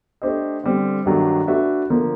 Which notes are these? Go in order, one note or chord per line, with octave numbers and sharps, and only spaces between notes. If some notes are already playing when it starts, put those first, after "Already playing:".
A3 D4 G4 C5 D#5
D3 G3 C4
G2 D#3 F#3 A3 D4
A3 D4 F#4 B4 E5
D3 F3 A#3